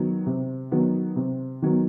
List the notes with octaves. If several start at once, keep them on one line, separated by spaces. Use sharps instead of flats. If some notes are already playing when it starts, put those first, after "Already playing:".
Already playing: D#3 F#3 B3
C3
D#3 F#3 B3
C3
D#3 F#3 B3